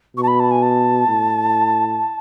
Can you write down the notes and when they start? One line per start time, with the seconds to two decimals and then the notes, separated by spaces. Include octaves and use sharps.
0.16 B2 C#6
0.23 A5
0.28 B5
0.40 A5
0.51 G#5
0.62 A5
1.08 A2